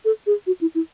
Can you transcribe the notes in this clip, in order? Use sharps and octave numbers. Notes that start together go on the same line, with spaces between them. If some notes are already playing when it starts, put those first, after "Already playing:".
A4
G#4
F#4
E4
E4